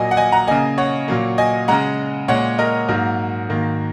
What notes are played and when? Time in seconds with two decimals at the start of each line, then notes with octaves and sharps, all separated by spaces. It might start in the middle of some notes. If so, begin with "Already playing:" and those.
Already playing: A#2 F#3 A#3 D#5 G#5
0.11 F#5
0.17 D#5 G#5
0.32 F#5 A#5
0.47 C#3 A#3 D#5 G#5
0.78 C#5 F#5
1.08 A#2 F#3 A#3
1.38 D#5 G#5
1.68 C#3 G#3 F#5 A#5
2.28 A#2 G#3 C#5 F#5
2.58 A#4 D#5
2.88 G#2 F#3 A#3 F#4 A#4
3.49 G#2 D#3 A#3